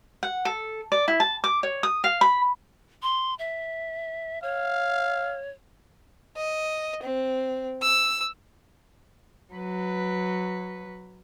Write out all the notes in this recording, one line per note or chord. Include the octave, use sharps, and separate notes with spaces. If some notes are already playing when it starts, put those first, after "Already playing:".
F#5
A4
D5
E4
A5
D6
C#5
D#6
F5
B5
C6
E5
C#5 F5
D#5
C4
E6
F#3 B4